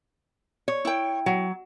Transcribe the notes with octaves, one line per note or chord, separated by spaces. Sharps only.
C#5
E4 G5
F#3